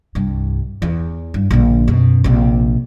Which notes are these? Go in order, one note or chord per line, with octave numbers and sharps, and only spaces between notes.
C2 G2
E2
G2
A#1 D3
F#2 B2
A#1 C3